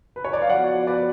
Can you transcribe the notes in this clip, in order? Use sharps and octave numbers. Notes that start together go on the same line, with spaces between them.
B4
C#5
D5
F5
F3 B3 F#4 D5 F#5
B4 D5